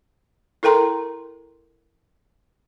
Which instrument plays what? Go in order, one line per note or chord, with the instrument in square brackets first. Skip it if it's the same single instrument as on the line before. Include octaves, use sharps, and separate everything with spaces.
[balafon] E4 A4 A#4 G5 A#5 C6